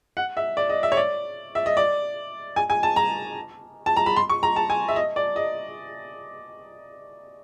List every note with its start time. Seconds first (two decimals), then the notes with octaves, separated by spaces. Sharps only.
0.17 F#5
0.37 E5
0.57 D5
0.70 D#5
0.83 E5
0.92 C#5
0.97 D5
1.55 E5
1.66 D#5
1.77 D5
2.56 G#5
2.70 G#5
2.83 A5
2.96 A#5
3.86 A5
3.97 A#5
4.06 B5
4.16 C6
4.29 C#6
4.43 A#5
4.56 A5
4.70 G#5
4.88 E5
4.96 D#5
5.16 D5
5.36 D#5